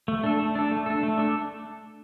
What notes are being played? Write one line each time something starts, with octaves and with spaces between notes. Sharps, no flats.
A3
D4 A4
A3
D4 A4
A3
D4 A4
A3
D4 A4